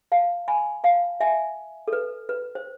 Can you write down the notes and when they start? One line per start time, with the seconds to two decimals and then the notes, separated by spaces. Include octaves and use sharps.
0.12 F5 A5
0.48 G#5 B5
0.84 F5 A5
1.20 E5 G#5
1.88 A4
1.93 B4
2.29 B4
2.55 C5